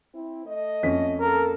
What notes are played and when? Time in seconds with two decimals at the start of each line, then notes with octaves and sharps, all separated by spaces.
0.14 C4 E4
0.45 A3 D#5
0.83 F2 C#4 B6
1.20 A#3 A4 A#4